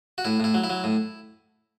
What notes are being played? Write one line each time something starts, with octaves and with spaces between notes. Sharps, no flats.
F#4
A2 E4
A2 E4
F#3
E4
F#3
A2